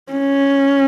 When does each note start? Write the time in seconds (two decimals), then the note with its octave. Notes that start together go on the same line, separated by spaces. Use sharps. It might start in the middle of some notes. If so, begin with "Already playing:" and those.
0.12 C#4